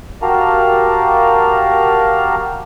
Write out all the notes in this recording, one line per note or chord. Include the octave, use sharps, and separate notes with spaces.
F#4 G4 A#4 F5 A5 A#5